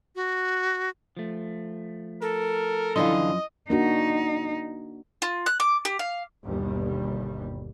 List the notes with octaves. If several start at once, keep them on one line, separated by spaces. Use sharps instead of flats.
F#4
F3 A3
A4 A#4
F#2 D3 E3 F3 D#5 F5 C6
A#3 D4 D#4 F#4
F4
F#6
D6
G4
F5
G1 D#2 B2 G3